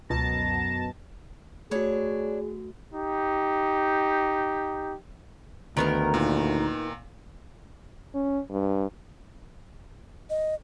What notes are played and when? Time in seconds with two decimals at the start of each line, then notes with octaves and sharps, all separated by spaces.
0.10 C#2 F#2 B2 A5 A#5
1.71 A3 D4 F#4 G#4 C#5
2.92 D#4 G4
5.77 D2 D#3 B3 A#4
6.14 A#2 D#4
8.14 C#4
8.51 G2
10.30 D#5